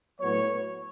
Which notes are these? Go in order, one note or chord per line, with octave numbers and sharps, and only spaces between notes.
A2 F#3 B3 C#5